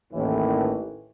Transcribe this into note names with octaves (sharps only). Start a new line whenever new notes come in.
A1 D#2 A2 D#3 E3